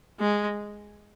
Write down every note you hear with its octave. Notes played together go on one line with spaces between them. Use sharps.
G#3